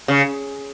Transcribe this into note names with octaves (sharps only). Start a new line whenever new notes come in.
C#3